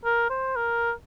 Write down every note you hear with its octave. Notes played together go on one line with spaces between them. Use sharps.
A#4
C5
A#4